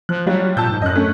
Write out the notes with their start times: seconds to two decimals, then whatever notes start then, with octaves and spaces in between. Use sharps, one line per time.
0.09 F3 F#6
0.26 F#3 G3 F4
0.57 A#2 A5 E6 G6
0.70 G#2
0.82 F#2 D#5 F#6
0.95 A3 C#4